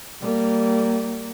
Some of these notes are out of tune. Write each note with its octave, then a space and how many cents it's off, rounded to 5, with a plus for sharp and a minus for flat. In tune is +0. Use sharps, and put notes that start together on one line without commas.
G3 -20 A#3 -25